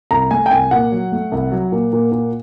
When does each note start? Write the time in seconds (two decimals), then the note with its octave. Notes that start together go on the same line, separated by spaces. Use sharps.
0.11 C2 A#5
0.31 A3 G#5
0.46 G5
0.51 C2 G#5
0.71 A#2 F#5
0.92 F#3
1.12 A3
1.32 C2
1.52 F#3
1.72 A#2
1.93 A#2
2.12 A#2